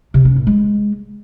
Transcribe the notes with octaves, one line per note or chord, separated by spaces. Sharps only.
C3
C#4
A#2
G#3